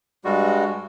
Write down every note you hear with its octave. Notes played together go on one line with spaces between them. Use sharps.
G2 G3 G#3 F#4